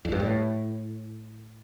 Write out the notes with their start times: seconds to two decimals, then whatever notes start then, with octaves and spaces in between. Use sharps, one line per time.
0.05 F2
0.12 G2
0.20 A2